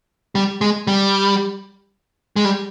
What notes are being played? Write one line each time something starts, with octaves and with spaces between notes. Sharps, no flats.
G3
G#3
G3
G#3
G3